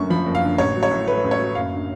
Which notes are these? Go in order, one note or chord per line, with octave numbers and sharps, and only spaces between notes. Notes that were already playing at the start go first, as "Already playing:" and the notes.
Already playing: F#1 F#2 D3 A3 C#6
F3 B5
F#1
F5
D3
A1 C#5
F#3
C#5
A2
A3 B4
A1
C#5
F#3
F#1 F5
D3